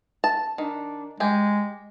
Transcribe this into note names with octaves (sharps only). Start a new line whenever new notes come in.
A5
D#3 D4
G#3 G4 G#5